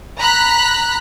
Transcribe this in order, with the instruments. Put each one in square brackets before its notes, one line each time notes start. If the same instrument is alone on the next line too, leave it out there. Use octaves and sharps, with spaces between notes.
[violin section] A#5 B5 F#6 B6